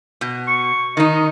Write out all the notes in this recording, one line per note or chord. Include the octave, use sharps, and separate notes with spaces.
B2
C#6
D#3 D#4 D#5